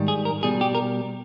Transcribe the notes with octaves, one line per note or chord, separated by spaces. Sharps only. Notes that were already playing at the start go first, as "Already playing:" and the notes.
Already playing: G#2 D#3 G3
G#4
A#4
B2 G3 G#4
G4
A#4